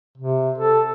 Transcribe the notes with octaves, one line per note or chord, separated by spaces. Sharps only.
C3
A4